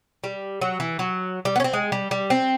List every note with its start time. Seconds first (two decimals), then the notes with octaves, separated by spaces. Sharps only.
0.24 G3
0.61 F#3
0.80 E3
0.99 F#3
1.45 G3
1.56 B3
1.60 C#4
1.64 C4
1.73 G#3
1.92 G3
2.11 G3
2.30 C4